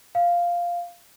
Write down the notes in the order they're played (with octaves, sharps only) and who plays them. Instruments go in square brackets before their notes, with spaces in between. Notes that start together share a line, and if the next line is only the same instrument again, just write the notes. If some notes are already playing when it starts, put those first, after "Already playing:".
[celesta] F5